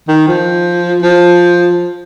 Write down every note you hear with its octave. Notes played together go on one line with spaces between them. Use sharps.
D#3
F3
F3